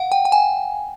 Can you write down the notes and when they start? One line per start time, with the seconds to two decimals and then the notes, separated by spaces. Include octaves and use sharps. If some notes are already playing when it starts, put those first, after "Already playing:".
Already playing: F5 F#5
0.12 G5
0.25 G5
0.32 G#5